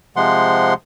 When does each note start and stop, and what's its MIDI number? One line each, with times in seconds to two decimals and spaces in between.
0.16 0.74 48
0.16 0.74 53
0.16 0.74 56
0.16 0.74 78
0.16 0.74 84